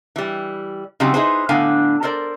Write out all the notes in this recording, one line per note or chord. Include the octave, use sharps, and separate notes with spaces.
E3 G3
C#3 F#3 G3 C4 D#4 G4
D#4 E4 G#4 B4 C5
A2 D3 B3 D4 F5 G#5
A4 A#4 C5 D5